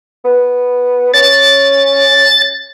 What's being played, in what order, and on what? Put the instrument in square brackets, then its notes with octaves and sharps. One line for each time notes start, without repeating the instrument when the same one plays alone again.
[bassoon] B3
[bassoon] C#4 [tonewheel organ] A6